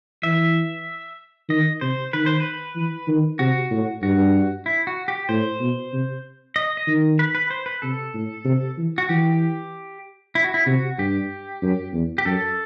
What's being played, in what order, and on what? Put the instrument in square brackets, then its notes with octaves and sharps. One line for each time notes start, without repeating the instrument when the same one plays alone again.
[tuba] E3 [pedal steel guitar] E5
[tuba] D#3 [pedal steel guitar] D#5
[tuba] C3 [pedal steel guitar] C5
[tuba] D#3 [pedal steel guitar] B4
[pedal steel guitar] C5
B4
[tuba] E3
D#3
[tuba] C3 [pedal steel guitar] F#4
[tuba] A2
[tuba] G2 [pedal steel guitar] F#4
[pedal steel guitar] E4
F#4
G4
[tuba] A2 [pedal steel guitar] C5
[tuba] B2
C3
[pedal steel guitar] D#5
D#5
[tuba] D#3
[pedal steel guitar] B4
B4
C5
B4
[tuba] C3 [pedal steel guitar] A4
[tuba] A2
C3
E3
[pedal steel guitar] F#4
[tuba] E3 [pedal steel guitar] G4
[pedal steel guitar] E4
F#4
E4
[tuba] C3 [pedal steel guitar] F#4
[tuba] G2 [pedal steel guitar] G4
[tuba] F#2
E2
[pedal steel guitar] G4
[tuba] F#2 [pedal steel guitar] A4